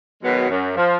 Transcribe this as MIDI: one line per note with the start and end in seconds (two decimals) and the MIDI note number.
0.23 0.49 47
0.23 0.49 51
0.23 0.49 54
0.23 0.49 56
0.23 0.49 59
0.49 0.75 42
0.76 0.97 53